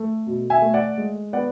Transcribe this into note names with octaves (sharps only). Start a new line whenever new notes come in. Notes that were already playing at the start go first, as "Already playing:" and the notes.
Already playing: A3
B2
E5 G#5
A3
D5 F#5
G#3
B3 D5 F#5